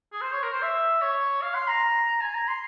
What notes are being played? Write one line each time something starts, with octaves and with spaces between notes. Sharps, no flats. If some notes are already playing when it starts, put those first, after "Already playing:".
G#4
C5
C#5
A#4
C5
E5
C#5
F5
C6
A#5
G#5
A#5
C6